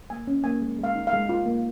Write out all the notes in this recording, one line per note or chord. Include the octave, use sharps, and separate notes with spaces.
A#3 G#5
C#4
A#3 G#5
G#3
G#3
F5
D#4
F5
G#3
F4
A#3